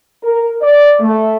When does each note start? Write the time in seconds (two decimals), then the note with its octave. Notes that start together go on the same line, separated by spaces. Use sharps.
0.23 A#4
0.61 D5
1.00 A3